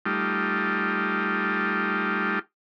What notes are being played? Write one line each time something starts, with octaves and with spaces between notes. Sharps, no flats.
G3 A3 D#4 F4 G4